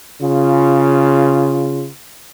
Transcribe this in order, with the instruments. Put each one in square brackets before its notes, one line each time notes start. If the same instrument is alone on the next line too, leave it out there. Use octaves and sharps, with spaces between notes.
[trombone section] C#3 F4